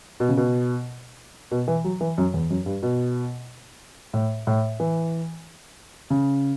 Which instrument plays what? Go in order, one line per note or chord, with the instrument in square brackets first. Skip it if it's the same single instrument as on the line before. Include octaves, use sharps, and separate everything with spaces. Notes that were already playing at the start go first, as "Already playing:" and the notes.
[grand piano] B2
C#3
B2
B2
E3
F#3
E3
F#2
E2
F#2
G2
B2
A2
A2
E3
C#3